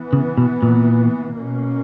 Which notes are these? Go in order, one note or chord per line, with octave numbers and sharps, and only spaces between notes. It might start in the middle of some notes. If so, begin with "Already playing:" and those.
Already playing: E3 B3
C#3
B2
A#2
B2 A#3 C#4